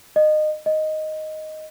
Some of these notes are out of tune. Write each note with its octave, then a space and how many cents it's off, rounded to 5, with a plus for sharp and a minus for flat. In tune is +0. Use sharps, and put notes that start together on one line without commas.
D#5 -25
D#5 +0